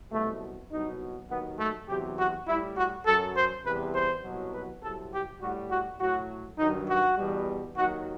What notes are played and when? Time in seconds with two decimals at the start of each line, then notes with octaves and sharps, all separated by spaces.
0.12 C2 B2 F#3 A3
0.71 C2 B2 F#3 D#4
1.29 D#2 D#3 F#3 B3
1.59 A3
1.88 E2 C3 F#3 G4
2.18 F#4
2.47 A2 G3 E4
2.77 F#4
3.06 F#2 F#3 A4
3.36 C5
3.65 E2 C3 E3 G3 B4
3.94 C5
4.24 C2 B2 F#3
4.53 B4
4.82 C2 C3 F#3 A4
5.12 G4
5.41 A2 G3 F#4
5.71 F#4
6.00 A2 F#3 F#4
6.58 G2 D#3 F#3 D#4
6.88 F#4
7.17 E2 B2 G3
7.76 D#2 D#3 F#3 F#4